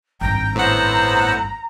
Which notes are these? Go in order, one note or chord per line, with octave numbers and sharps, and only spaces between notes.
G#1 G2 G5 A#5
A2 B3 C5 F#5 E6